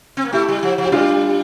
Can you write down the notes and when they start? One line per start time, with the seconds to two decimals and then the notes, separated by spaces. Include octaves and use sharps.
0.17 C4
0.25 A#3
0.33 A3 E4 G4
0.48 G3
0.63 F3
0.78 F3
0.86 G4
0.92 G3 D4 F4